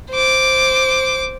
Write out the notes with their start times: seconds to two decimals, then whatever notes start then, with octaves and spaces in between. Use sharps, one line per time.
0.11 C5 D6